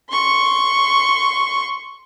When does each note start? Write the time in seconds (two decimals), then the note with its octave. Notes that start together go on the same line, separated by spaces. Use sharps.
0.11 C6 C#6